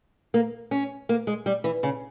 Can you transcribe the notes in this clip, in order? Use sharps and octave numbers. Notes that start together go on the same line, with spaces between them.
A#3
C#4
A#3
G#3
G3
E3
C#3